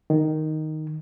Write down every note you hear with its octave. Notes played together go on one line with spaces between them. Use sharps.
D#3